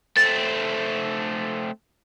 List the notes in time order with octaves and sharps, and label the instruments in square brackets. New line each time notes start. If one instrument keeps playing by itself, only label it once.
[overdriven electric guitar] A3 C4 [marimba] A6